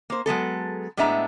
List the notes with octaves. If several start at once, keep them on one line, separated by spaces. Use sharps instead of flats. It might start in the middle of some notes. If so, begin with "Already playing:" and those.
A#3 C5
F#3 G#3 B3 A4
A2 G#3 B3 D4 E5 A#5